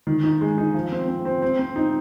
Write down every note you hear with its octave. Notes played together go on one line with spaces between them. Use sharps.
D#3
D#4
G#3
D#4
F3
C4
C4
C4
C4
C4
D#4